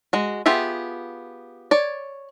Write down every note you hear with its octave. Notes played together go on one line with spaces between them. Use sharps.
G#3 F#4
B3 F4 G4 G#4 E5
C#5 D5